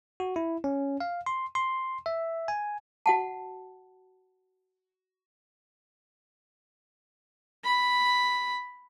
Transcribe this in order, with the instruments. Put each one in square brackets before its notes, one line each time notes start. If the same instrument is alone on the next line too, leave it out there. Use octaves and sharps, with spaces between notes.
[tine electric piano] F#4
E4
C#4
F5
C6
C6
E5
G#5
[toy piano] F#4 F#5 A5
[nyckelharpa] B5